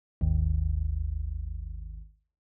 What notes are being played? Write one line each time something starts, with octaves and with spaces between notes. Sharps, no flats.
G#1 D#2